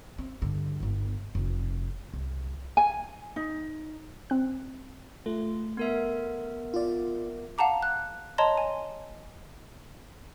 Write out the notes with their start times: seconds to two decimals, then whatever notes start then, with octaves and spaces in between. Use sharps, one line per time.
0.18 C4
0.42 G2 D3
0.80 G1 B3
1.35 F1
2.14 C2
2.77 G#5
3.36 D#4
4.30 C4 F#6
5.26 A3 F4
5.77 B3 A#4 E5
6.74 F4 D5
7.58 F5 F#5 A5 A#5 D6
7.82 F#6
8.38 C#5 D#5 A5 A#5 C6
8.57 G#5